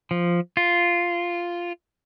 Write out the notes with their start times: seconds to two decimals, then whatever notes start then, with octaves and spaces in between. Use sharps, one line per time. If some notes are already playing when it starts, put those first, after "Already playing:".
0.11 F3
0.57 F4